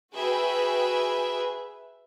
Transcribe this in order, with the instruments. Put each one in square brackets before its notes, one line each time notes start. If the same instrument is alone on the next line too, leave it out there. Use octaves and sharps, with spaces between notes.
[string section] F#4 G#4 B4 E5 G5